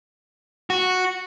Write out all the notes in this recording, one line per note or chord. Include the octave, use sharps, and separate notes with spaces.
F#4